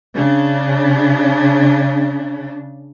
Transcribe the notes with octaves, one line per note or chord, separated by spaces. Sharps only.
C#3 D4